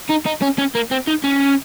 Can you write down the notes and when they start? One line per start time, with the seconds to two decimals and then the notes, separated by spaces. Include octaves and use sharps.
0.10 D#4
0.26 D#4
0.42 C#4
0.58 C#4
0.75 A#3
0.91 C4
1.07 D#4
1.24 C#4